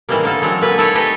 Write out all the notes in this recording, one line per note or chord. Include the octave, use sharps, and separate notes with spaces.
A2 D#3 E3 G3 G#3 A#3
D3 A#3 A4
F#3 G#3 A3 C4
A#2 D3 A3 A#3 B4 G#5
D#4 E4 A4 B4 C#5 D5
A3 G4 A4 B4 D#5 G#5